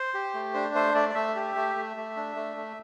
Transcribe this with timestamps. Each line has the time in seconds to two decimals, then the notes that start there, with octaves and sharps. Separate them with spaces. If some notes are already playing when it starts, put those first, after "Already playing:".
Already playing: C5
0.14 G4
0.34 A3
0.54 D4 C5
0.74 A3 C5
0.95 A3 D5
1.09 D5
1.15 A3 E5
1.35 G4
1.55 A3
1.76 A3
1.96 A3
2.16 D4
2.36 A3
2.57 A3